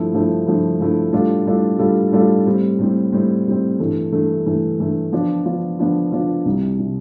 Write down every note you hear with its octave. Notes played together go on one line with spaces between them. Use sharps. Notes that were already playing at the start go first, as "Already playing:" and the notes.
Already playing: G2 F3 A3 E4
G2 F3 A3 E4
G2 F3 A3 E4
G2 F3 A3 E4
A2 G3 D4 F4 A4
A2 G3 D4 F4 A4
A2 G3 D4 F4 A4
A2 G3 D4 F4 A4
A2 G3 C4
A2 G3 C4
A2 G3 C4
A2 G3 C4
G2 E3 A3
G2 E3 A3
G2 E3 A3
G2 E3 A3
D3 F3 B3 D4 F4
D3 F3 B3 D4 F4
D3 F3 B3 D4 F4
D3 F3 B3 D4 F4
C2 C3 G3
C3 G3